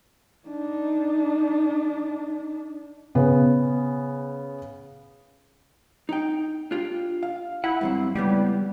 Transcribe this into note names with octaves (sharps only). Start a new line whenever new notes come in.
D4 D#4
C#3 B3
D#4 G5
D4 F4 G4
F5
E4 F#5
G2 F#3 C4
C#2 A2 G3 B3